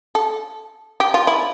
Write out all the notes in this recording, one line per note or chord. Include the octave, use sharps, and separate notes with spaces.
A4
G4
F4
E4